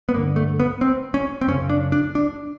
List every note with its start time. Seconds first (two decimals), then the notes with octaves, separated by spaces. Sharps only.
0.09 B3
0.14 G2 D3 A#3
0.36 A3
0.60 B3
0.81 C4
1.14 C#4
1.41 C4
1.47 F#2 C#3 C#4
1.70 D4
1.92 D4
2.15 D4